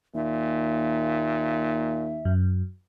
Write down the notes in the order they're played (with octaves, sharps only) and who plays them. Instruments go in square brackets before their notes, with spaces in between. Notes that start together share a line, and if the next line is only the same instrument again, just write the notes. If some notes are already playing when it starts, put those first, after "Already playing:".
[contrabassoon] D#2 [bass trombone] A#2 [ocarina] E5
[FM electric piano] F#2